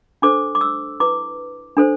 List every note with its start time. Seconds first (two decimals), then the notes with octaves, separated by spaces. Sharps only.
0.22 D4 A4 C5 D6
0.55 D6
0.61 E6
1.00 E4 B4 D6
1.77 D4 A4 C5